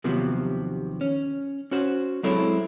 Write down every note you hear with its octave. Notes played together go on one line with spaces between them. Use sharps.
D#2 C3 F3 F#3 B3
C#4
C#4 F#4 C5
F#3 G#3 C4 E4 A4 C#5